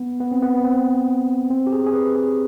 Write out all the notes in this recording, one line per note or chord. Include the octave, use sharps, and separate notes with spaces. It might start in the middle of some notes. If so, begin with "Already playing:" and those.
Already playing: B3
B3
C4
B3
B3
C4
C4
G4
G#4
G#4
B4
G#4